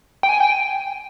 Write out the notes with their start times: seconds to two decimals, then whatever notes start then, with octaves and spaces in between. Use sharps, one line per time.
0.23 G5
0.29 G#5
0.40 G5